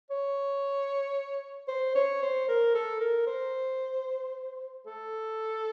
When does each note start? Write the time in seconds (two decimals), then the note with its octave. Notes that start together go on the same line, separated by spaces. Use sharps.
0.10 C#5
1.68 C5
1.95 C#5
2.22 C5
2.48 A#4
2.75 A4
3.00 A#4
3.27 C5
4.86 A4